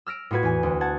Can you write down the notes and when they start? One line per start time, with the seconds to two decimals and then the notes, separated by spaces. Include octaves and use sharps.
0.06 E6 F6 A#6 D7
0.31 A2 F4 F#4 B4 G#6
0.43 E2 G#5
0.63 D2
0.81 F#5 A5 G#6